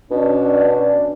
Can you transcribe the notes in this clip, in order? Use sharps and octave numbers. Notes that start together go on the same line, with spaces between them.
B2 C#4 D4